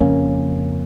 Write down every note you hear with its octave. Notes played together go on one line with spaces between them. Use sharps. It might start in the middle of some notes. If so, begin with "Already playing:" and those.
F2 C#3 A#3 C#4